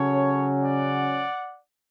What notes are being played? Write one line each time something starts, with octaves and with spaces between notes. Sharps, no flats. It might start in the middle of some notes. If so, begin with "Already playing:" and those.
Already playing: C#3 F#3 C#4 A4 C#5
D5 F#5